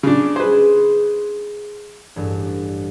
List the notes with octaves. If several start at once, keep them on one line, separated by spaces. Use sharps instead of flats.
C#3 D4
G#4 B4 C5
A1 G2